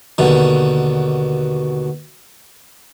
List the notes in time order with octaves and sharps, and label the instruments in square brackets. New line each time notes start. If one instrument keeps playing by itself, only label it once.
[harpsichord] D#2 B2 D3